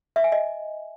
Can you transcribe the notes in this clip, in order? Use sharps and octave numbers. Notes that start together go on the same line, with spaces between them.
E5
G#5
D#5